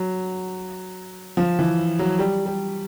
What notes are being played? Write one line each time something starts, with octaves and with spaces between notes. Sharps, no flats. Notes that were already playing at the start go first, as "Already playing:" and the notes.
Already playing: F#3
F3
E3
F#3
G3
G3